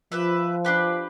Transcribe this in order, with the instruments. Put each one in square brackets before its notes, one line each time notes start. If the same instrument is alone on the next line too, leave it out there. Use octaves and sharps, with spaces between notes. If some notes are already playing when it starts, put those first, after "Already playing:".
[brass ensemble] F3 [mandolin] G4 B4 E5
[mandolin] D4 G4 B4